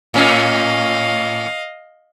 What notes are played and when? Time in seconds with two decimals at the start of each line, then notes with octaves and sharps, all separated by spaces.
0.14 A2 A#3 C#4 D#5 F5